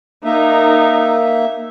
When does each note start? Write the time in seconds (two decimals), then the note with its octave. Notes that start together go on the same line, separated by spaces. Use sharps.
0.25 A#3 D#4 A#4 E5